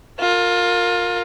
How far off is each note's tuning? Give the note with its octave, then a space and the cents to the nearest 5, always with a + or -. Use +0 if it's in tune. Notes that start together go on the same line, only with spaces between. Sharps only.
F4 +20 A#4 -20